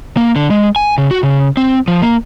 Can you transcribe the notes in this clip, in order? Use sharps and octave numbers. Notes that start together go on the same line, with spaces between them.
A#3
D3
G#3
G#5
C#3
F#4
C#3
C4
F3
A#3